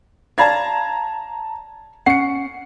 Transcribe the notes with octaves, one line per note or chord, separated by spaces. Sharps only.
C#5 D5 F5 A5 A#5 G#6
C#4 F#5 C7 C#7